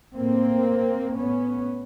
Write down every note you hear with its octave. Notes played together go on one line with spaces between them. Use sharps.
A2 A#3 C4
A2 B3 C#4